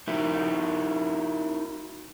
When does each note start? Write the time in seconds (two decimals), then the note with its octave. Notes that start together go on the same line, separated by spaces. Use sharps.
0.08 A#3 D#4 E4 F#4 A#4 E5